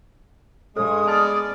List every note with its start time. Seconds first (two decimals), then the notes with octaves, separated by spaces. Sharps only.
0.77 G2 G#3 A4 D#6
1.08 B3 D5 A5 F6 A6